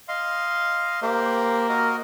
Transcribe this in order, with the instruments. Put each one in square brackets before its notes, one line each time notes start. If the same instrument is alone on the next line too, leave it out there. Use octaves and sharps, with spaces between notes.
[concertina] D#5 F5 C6
[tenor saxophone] A#3 [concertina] G4 C5
[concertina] F#4 A#4 D#5